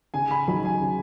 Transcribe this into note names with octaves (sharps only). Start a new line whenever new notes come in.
C#3 G#5
B5
F#3 D#4 B5
G#5
C#3